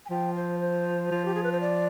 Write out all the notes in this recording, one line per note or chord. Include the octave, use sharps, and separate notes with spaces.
G#5
F3 G5
C5
C5
F3
G4
G#4
B4
C5
D5